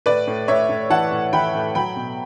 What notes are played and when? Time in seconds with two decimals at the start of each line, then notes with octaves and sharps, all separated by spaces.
0.06 A2 B4 D5
0.27 A2
0.48 A2 C#5 E5
0.69 A2
0.90 E3 F#5 A5
1.12 A2
1.33 E3 G5 B5
1.55 A2
1.75 F#3 G5 B5
1.96 B2